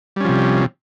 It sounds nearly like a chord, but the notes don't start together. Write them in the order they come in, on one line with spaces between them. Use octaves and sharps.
G3 C#4 F3 C3